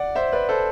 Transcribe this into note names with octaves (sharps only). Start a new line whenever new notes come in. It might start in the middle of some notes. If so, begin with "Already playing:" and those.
Already playing: D5 F#5
C5 E5
B4 D5
A4 C5